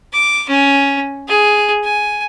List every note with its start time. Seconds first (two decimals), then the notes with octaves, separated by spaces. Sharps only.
0.13 D6
0.49 C#4
1.28 G#4
1.84 G#5